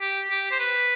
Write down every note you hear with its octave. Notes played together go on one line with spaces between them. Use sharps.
G4
G4
C5
B4